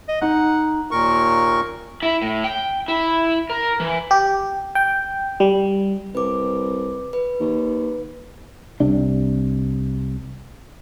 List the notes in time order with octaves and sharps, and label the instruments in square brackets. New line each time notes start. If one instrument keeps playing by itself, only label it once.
[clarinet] D#5
[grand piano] D#4 [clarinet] F#5
[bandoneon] D#2 A#2 A#4 C#6
[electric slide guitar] E4
A2
G5
E4
A#4
E3
[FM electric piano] G4
G5
G3
[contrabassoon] C2 [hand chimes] B4 D6
[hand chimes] B4
[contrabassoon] D#2
[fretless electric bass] C2 C3 D4